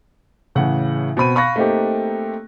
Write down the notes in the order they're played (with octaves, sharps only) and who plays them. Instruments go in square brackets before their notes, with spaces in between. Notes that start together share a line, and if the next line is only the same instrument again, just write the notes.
[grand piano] A2 C#3 E3 G#4 F#5
B2 C4 B5 D#7
F5 B5 C#6 F#6 A#6
A3 A#3 C4 D#4 G4